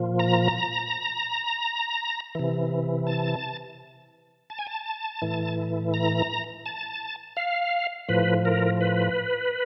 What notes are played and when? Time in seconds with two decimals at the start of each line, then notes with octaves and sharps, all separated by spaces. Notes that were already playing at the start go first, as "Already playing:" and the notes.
Already playing: A#2 F3
0.19 A#5
2.35 C3 E3
3.07 A5
4.50 A5
4.59 G#5
4.67 A5
5.22 A2 E3
5.94 A#5
6.66 A5
7.37 F5
8.09 A2 F3 B4
8.45 A#4
8.81 B4